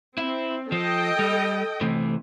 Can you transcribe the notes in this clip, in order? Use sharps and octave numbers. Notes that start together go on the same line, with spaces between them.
C4 E4
F3 A4 D#5 G5
G3
C3 E3 A3